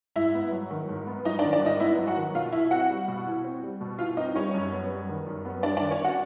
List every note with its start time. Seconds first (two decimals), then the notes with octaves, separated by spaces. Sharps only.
0.16 G#2 E4 E5
0.34 B3
0.52 F#3
0.70 D#3
0.89 G#2
1.07 B3
1.25 F#3 D#4 D#5
1.39 D4 D5
1.44 D#3
1.53 D4 D5
1.62 G#2 D#4 D#5
1.79 B3 E4 E5
1.98 F#3
2.07 F#4 F#5
2.16 D#3
2.35 B2 F4 F5
2.52 E4 E5
2.71 C4 F#4 F#5
2.90 G3
3.08 B2
3.27 E4
3.44 C4
3.63 G3
3.81 B2
3.99 E4 F4 F5
4.17 C4 D#4 D#5
4.35 G3 C#4 C#5
4.54 F#2
4.72 B3
4.90 G3
5.09 D#3
5.26 F#2
5.45 B3
5.63 G3 D4 D5
5.77 D4 D5
5.81 D#3
5.91 C#4 C#5
6.04 F#4 F#5